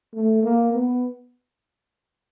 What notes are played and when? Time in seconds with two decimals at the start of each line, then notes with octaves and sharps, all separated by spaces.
0.14 A3
0.43 A#3
0.72 B3